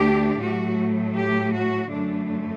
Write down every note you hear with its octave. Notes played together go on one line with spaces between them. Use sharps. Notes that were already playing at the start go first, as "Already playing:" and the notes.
Already playing: D2 D3 A3 D4 G4
A2 F#3 A3 F#4
G4
F#4
F#2 D3 A3 D4